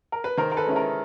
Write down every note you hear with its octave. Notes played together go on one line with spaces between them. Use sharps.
A#4
B4
D#3 A#4 C5
A#4
A4 B4
G#3 C#4 E4
A#4